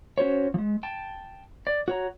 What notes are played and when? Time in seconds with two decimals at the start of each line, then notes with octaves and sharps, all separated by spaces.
0.18 C#4 F#4 C5 C#5
0.54 F3 G#3
0.83 G5 A5
1.67 D5
1.88 F#4 C#5 A#5